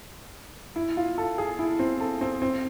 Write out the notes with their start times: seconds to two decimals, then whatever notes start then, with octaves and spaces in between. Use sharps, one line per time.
0.76 E4
0.97 F4
1.18 A4
1.38 G#4
1.59 E4
1.79 C4
2.00 A4
2.21 C4
2.42 C4